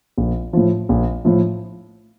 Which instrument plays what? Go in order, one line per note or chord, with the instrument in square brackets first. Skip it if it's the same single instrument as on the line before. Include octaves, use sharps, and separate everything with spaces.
[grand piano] A#1
A2 F3
A#1
A2 F3